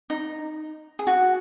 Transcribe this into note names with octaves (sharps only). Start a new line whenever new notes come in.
D#4
G#4
F#4